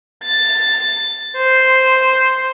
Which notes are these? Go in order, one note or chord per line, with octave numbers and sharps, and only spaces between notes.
A6
C5